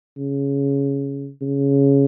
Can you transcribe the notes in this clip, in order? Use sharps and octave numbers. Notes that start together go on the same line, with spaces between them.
C#3
C#3